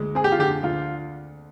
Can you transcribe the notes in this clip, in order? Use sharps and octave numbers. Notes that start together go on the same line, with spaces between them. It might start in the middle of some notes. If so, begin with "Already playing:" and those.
Already playing: D2 G#3
C4 G#4
G4
F4
D3 G4
D2 F4